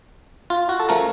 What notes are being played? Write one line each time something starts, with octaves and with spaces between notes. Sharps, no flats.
F4
F#4
A4
C#3 F3 A3 A#4